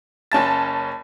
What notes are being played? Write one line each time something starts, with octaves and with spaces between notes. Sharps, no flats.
F#1 C#4 A5 A6